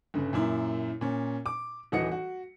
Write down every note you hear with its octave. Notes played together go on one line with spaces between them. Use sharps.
G1 C#3
F#2 A#2 E4
A#2 C#4
D6
D#1 E3 F#4 D#5 C#7
F#4